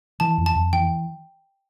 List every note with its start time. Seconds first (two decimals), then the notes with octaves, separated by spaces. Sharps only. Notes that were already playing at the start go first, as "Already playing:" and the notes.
0.20 E3 A5
0.38 F2
0.46 A5
0.55 F2
0.73 E3 G5